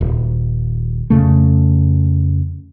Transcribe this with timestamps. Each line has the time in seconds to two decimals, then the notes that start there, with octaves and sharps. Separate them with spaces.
0.01 D#1
1.10 F2 C#3 A3